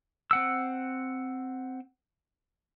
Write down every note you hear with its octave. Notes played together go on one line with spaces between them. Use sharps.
C4 F#5 E6